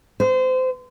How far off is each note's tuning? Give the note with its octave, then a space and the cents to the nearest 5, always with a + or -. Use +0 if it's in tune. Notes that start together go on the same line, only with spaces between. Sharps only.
C5 -30